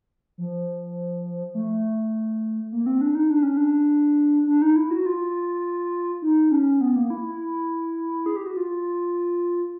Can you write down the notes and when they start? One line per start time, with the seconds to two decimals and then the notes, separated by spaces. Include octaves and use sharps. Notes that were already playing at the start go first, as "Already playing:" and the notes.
0.38 F3
1.55 A3
2.72 A#3
2.86 C4
3.01 D4
3.15 D#4
3.30 D4
3.43 C#4
3.57 D4
4.47 D4
4.62 D#4
4.76 E4
4.91 F#4
5.06 F4
6.22 D#4
6.51 C#4
6.81 B3
6.96 A#3
7.10 E4
7.24 E4
8.26 G#4
8.36 G4
8.46 F#4
8.57 F4